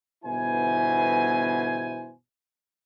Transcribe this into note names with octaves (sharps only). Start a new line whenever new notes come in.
G1 B2 E3 E4 C5 G#5